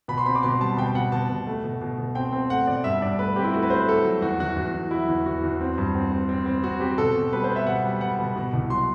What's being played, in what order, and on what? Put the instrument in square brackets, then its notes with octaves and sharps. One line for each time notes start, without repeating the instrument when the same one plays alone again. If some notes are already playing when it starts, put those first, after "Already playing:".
[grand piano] B2 B5
C6
C4 B5
D6
B2 C6
G3 A5
B2 G5
B2 F#5
B2 A5
B2
A3
B2
B2
B2
C4 G5
C4
A3 F#5
B2 D5
G2 E5
G2 D5
A3 B4
C4 G4
E4
A3 F#4
B4
A3 C5
B4
A3 A4
F#3
E2 F#4
E2 F#4
E2
E2
F#3 E4
E2
E2 F#4
E2
C4
G2
C4
C4
C4
C4
C4 F#4
C4 G4
B2 A4
B2
G3 B4
C5
B3
E5
B2 F#5
G3
B3 F#5
B2
B2
C2
F#3 C6